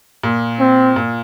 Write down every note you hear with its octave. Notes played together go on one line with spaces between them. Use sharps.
A#2
C4
A#2